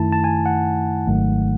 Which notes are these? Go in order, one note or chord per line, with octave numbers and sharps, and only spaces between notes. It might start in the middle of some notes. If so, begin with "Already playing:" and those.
Already playing: F#2 D#3 A3 E4 A5
A5
G#5
F#5
G#1 G#2 D#3 F#3 A3